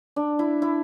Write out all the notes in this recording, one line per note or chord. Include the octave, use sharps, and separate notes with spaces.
D4
E4
E4